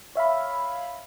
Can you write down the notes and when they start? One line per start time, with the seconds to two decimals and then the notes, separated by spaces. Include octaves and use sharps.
0.15 C#5 E5 F5 B5